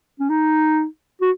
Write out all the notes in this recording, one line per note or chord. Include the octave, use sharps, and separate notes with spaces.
C#4
D#4
F#4